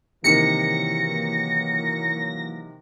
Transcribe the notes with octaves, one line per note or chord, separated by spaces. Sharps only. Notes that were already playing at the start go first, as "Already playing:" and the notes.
C3 D#3 E3 F#3 A#3 A#6 C#7